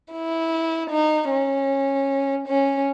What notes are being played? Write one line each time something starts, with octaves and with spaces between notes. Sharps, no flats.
E4
D#4
C#4
C#4